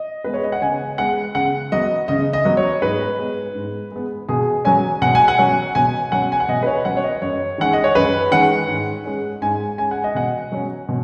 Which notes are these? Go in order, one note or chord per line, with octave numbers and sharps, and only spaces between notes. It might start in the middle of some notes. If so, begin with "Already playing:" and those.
Already playing: D#5
G#3 B3 B4
C#5
D#5
F#5
C#3 G#5
G#3 B3 F#5
C#3 F#5
F#3 B3 D#5
C#3 D#5
D#5
F#3 B3
C#5
G#2 B4
G#3 B3
G#2
G#3 B3
B2 G#4
F#3 C#4 G#5
B2 F#5
G#5
F#5
F#3 C#4
B2 G#5
F#3 C#4 F#5
G#5
F#5
B2 D#5
B4
C#5
F#3 C#4 F#5
C#5
D#5
F#2 C#5
D#3 G#3 C#4 F#5
D#5
C#5
F#2 B4
D#3 G#3 C#4 F#5
G#2
G#3 C#4
G#2 G#5
G#3 C#4 G#5
F#5
D#5
B2 F#5
F#3 C#4
B2